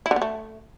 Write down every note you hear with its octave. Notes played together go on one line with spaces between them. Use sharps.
E4
D3
B3
A3